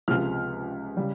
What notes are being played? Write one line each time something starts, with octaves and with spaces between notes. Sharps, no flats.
C#2 C3 F3 G#3 F6
C#3 G3